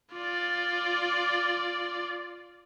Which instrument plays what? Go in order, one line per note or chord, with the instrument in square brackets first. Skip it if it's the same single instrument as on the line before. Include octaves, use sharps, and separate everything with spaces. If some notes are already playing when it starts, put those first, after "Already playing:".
[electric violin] F4 D5